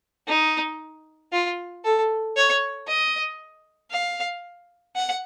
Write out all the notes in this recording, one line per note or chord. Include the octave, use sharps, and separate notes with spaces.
D#4
F4
A4
C#5
D#5
F5
F#5